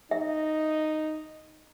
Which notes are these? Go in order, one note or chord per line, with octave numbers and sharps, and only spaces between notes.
D#4 E5